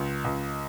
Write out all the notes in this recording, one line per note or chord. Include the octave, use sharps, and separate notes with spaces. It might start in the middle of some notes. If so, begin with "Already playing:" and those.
Already playing: C#2
C#2